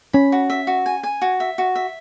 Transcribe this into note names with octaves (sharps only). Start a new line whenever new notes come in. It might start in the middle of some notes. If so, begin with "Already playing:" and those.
C#4 B5
F#4
E5
F#4
G#5
G#5
F#4
E5
F#4
E5